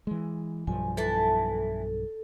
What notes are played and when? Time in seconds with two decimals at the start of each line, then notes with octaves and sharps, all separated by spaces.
0.07 E3 G#3
0.67 B1 G2 F3 G#5
0.97 E3 A4 A5